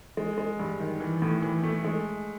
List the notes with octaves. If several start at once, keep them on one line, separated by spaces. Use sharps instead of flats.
G#3
G#3
G2
D#3
E3
A2
E3
A3
G#3